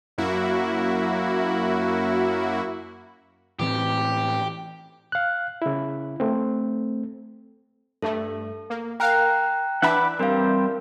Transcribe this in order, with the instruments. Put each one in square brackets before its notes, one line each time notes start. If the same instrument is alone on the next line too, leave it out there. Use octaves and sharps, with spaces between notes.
[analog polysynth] F#2 A#3 E4 F#4
[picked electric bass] A2 E3 C4 [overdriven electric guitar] G4
[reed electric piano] F5 F#6
C#3 E4
A3 C4
[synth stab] G2 A3 [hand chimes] A4
[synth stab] A#3
[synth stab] A#4 F5 [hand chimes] G5 A#5 F#6
[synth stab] E3 D4 E5 [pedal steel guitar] F#5 B5 D6
[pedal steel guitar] G3 C4 G4 [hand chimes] A#4 F5